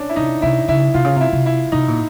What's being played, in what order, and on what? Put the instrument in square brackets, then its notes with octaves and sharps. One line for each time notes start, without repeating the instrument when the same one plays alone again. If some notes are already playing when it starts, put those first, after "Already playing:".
Already playing: [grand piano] C#4 D4
E4
[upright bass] C3 [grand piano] D#4
[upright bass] C3 [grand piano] E4
[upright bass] C#3 [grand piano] E4
[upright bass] C3 [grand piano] F4
[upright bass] C#3
[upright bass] C3 [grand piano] E4
[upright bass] C3
[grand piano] E4
[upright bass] C3 [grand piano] D#4
[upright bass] A#2